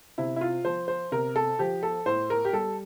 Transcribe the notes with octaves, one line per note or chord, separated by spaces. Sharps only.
C3 E4
E4
F4
F3 C5
C5
C3 A#4
A4
F3 G4
A4
A2 C5
A#4
G4
G3 A4